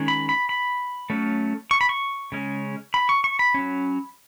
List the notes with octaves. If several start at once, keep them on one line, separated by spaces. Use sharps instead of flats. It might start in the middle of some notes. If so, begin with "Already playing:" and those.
Already playing: D#3 G#3 C#4
B5
B5
B5
F#3 A3 C#4
C#6
B5
C#6
C#3 G#3 C#4
B5
C#6
C#6
B5
F#3 C#4